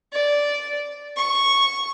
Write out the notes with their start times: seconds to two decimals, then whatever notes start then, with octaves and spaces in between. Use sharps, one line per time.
0.13 D5
1.17 C#6